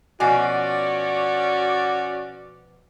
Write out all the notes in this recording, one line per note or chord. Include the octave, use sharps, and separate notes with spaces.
B2 F3 C#4 F#4 D5 G#5